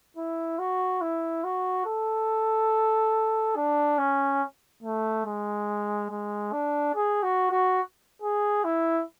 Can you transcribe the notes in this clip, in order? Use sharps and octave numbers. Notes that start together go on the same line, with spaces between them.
E4
F#4
E4
F#4
A4
D4
C#4
A3
G#3
G#3
D4
G#4
F#4
F#4
G#4
E4